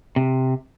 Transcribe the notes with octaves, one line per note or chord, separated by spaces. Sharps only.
C3